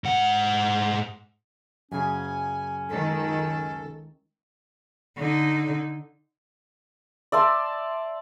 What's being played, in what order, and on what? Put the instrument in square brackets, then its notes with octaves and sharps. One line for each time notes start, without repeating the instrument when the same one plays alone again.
[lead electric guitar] G#2 F#5
[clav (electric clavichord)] F#2 C#3 G#4 [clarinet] C#4 [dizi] G#5
[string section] C#2 D#3 [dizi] A4
[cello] D3 D#4
[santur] D5 E5 A5 C6